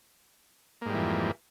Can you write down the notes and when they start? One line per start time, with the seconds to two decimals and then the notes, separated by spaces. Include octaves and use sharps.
0.81 A#3
0.86 G#2
0.90 G3
0.94 E3
0.98 F2